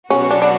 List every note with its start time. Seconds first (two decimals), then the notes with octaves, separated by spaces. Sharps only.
0.10 B2 F#3 B3 C#4 F#4
0.31 D4
0.42 D4